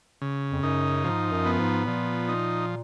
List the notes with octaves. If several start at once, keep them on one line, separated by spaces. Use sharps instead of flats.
C#3
F2
F#2 D#4
G#2 F3
F#2
B3
G#2
A#2 F3
D#4